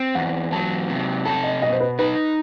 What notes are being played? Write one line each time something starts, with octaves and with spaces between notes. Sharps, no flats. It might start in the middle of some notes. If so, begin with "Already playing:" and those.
Already playing: C4
E2 F#5
F#3 A5
C3
A4 A5
D#5
B2 D#5
C5
B4
D#4 B4